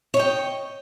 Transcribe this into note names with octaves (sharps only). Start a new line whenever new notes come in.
C#5 D#5 G5